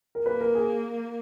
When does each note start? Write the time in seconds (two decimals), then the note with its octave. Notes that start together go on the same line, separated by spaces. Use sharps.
0.15 A#4
0.26 A#3 B4
0.41 A#4
0.55 G#4